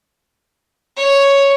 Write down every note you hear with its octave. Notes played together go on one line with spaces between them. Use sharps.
C#5